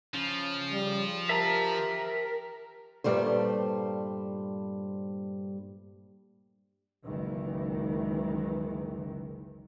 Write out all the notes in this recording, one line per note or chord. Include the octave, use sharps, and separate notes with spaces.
C#3 F3
G3
G4 A#4 E5 A5 A#5
G2 A#2 G3 A3 C5
F#1 C#2 D#3 E3